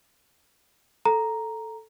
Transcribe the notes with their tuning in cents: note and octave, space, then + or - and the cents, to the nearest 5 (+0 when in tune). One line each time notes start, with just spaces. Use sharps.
A4 +0 A#5 +0